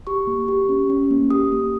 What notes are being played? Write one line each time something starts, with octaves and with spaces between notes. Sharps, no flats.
G4 C#6
A#3
G4
C#4
C#4
A#3
G4 D#6
A#3